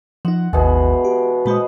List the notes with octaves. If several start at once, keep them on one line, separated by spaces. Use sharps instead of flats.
F3 D#4 F#5
G#1 D#2 B2 E3 G#3
G4
A#2 G#3 F#4 B4 C5 D#5